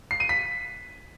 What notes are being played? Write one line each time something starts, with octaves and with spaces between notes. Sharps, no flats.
C7
D#7
B6